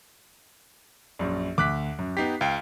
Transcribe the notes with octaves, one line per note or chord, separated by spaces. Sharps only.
A#1 F#2
D2 D6 F#6 B6
F#2
B3 D#4 G4 B6 C7
C#2 F5 G5